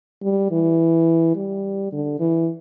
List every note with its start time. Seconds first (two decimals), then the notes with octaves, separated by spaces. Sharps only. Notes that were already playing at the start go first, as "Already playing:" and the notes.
0.23 G3
0.51 E3
1.35 G3
1.92 D3
2.20 E3